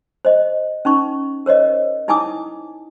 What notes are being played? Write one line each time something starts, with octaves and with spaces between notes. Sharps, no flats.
C5 D#5
C#4 D#4 C#6
A#4 C5 C#5 D#5
D#4 E4 G#5 A5 D6 D#6